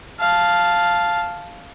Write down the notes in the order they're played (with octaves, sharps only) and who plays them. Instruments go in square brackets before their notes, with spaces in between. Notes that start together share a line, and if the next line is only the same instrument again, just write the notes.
[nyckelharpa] F5 A5